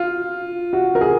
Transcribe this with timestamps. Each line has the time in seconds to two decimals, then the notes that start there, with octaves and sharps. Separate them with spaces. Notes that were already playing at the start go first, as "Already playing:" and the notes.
Already playing: F4
0.73 F#4
0.95 A#4
1.01 G#4